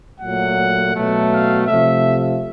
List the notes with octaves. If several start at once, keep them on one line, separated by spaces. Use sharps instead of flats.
A#2 F#3 A3 F#5
B2 F#3 A3
F5
C3 F3 A3 E5